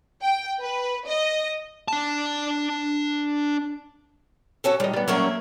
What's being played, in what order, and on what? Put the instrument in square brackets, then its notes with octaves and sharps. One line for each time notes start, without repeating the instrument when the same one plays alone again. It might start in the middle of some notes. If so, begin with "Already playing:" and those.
[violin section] G5
B4
D#5
[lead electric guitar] D4 A5
[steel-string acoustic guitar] F#3 C#4 A4
[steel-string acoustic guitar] D#3 [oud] G3 D#5
[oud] G3 B3
[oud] F#3 A#3 C#4 [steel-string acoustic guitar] A3 A#4 C#5